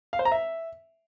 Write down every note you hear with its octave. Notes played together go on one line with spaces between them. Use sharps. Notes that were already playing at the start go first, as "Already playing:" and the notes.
F5
C5
A#5
E5